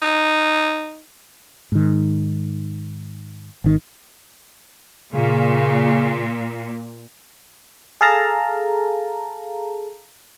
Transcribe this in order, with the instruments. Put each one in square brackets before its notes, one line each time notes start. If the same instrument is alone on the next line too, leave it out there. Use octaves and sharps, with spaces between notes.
[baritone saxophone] D#4
[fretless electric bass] G#2 D#3
G#1 D#3
[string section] A#2 [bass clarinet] C#3
[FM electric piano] G#4 A4 F5 A5 A#5